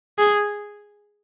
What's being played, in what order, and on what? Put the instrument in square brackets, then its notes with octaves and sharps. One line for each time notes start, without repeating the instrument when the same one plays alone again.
[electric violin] G#4